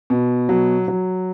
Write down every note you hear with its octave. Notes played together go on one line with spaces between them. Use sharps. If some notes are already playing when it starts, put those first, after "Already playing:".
B2
F#3
F#3